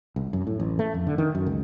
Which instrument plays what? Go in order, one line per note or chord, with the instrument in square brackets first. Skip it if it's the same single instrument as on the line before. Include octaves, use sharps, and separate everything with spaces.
[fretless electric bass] C2
F#2
A2
A1
A3
F2
D3
D#3
F#2
C#2